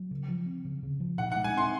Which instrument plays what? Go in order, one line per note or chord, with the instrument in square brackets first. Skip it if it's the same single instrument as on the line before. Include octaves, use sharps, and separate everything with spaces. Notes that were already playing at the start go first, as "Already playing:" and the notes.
Already playing: [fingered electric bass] F#3
C#3
F3
C4
C#3
C#3
F3
[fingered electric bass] A#2 [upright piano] F#5
[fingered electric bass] G#3 [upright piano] F#5
[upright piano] G#5
[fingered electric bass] C4 [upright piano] C6